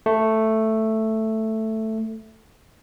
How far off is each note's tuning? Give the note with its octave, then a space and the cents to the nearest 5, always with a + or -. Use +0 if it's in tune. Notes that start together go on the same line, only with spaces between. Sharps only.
A3 +5